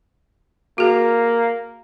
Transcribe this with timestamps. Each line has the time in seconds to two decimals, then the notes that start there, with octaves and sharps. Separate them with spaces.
0.78 A#3 F#4 G#4